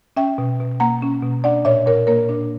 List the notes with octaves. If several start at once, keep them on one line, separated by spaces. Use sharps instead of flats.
C#4 E5 G5
B2
B2
A#3 F#5 A#5
C#4
B2
D4 D5 F#5
A#2 C#5 E5
A#2 A#4 C#5
A#3 A#4 C#5
D4